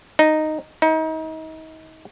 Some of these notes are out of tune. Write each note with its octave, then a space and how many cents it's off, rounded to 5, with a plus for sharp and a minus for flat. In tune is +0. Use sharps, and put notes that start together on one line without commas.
D#4 -5
D#4 +35